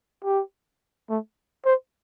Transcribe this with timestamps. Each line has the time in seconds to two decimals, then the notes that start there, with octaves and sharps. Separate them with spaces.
0.24 G4
1.10 A3
1.66 C5